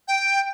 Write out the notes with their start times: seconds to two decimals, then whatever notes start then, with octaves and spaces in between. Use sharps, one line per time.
0.08 G5